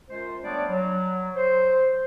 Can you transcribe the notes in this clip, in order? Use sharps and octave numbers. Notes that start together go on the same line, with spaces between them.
F#2 G#3 F4 C5
G3 A3 B3 D4 C#5 D5
F#3
C5